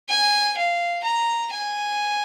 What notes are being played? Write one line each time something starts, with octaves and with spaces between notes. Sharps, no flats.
G#5
F5
A#5
G#5